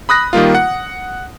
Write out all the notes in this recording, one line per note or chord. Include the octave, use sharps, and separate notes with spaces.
B5 D#6 F#6 A#6
D#3 G3 A#3 F4
F#5